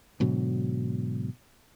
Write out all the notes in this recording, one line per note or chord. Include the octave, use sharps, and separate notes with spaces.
G#2 B2 D3 F#3